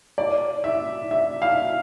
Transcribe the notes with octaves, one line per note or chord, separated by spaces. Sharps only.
D5
E5
E5
F5